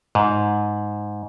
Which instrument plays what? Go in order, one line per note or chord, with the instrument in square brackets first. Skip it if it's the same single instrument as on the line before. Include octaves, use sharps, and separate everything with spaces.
[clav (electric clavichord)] G#2